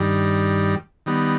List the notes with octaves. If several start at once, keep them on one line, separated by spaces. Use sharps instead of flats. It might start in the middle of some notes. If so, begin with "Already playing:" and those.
Already playing: G2 D#3 G3
D#3 G3 B3